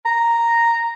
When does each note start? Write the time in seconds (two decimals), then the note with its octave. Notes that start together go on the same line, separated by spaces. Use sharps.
0.06 A#5